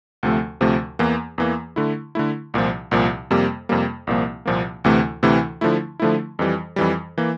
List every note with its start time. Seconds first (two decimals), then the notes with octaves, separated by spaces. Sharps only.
0.23 D2 C3 F3 A3
0.61 D2 C3 F3 A3
0.99 E2 E3 A#3
1.38 E2 E3 A#3
1.76 D3 A3 E4
2.15 D3 A3 E4
2.54 C2 A#2 F3
2.91 C2 A#2 F3
3.31 F2 C3 G3 A#3
3.69 F2 C3 G3 A#3
4.07 C2 A#2 F3 A#3
4.46 C2 A#2 F3 A#3
4.84 D2 C3 E3 A3 E4
5.23 D2 C3 E3 A3 E4
5.61 D3 F3 A3 E4
6.00 D3 F3 A3 E4
6.39 F2 E3 G3
6.76 F2 E3 G3
7.18 E3 A#3